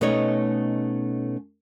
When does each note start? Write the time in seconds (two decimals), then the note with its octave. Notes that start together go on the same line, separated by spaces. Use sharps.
0.01 B2 A3 C#4 D#4 C#5 D#5